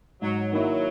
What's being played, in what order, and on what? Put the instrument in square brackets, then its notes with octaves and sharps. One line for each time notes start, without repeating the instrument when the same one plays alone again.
[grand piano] G#2 [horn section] F#3
[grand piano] D#3 A#3 E4 [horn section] F#3